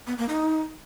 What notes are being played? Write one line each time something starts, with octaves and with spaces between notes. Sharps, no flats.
B3
A#3
D#4